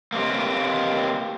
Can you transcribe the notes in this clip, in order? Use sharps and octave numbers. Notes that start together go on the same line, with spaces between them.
A#3 C4 G4